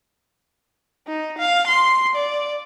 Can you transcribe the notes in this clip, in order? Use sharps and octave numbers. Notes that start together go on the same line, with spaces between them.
D#4
F5
C6
D5